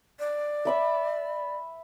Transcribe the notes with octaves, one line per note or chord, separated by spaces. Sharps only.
D5
E5 B5 E6